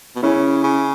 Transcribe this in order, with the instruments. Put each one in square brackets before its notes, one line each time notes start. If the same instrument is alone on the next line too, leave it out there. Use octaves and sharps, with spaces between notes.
[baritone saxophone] B2
[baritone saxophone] C#3 [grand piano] C#4 E4
[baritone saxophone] C#3